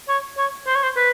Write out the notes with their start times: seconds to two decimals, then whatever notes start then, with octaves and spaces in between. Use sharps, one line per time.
0.09 C#5
0.38 C#5
0.67 C5
0.75 C#5
0.83 C5
0.96 B4